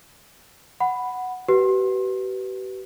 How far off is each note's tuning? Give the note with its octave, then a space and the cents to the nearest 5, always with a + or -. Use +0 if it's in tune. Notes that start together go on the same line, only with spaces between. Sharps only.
F#5 +0 B5 +5
G4 -45 B4 +0